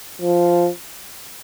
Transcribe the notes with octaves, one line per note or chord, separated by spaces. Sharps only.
F3